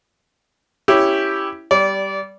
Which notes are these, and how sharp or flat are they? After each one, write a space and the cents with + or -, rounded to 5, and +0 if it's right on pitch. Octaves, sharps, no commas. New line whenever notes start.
C#4 +0 E4 +0 G4 +0
G3 -5 D5 -25